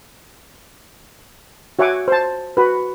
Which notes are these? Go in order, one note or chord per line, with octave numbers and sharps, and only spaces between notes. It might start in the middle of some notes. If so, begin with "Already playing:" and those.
F#4 C#5 E5 F#5 G#5 D6
C5 A5
F#4 B4